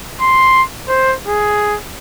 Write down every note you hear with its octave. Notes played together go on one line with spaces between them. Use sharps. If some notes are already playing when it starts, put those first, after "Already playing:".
C6
C5
G#4